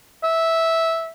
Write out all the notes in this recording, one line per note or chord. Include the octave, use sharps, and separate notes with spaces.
E5